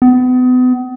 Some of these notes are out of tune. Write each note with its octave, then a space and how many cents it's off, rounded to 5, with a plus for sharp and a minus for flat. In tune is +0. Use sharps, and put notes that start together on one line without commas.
B3 +35